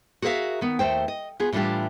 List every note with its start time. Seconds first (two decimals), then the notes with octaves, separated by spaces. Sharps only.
0.22 F#4 G#4 A#4 B4 E5 F5
0.61 D#3 B3
0.79 D#2 A3 C5 G5
1.08 D#5
1.40 B3 F4 G#4
1.52 A2 E3 G3 D4 F4 G4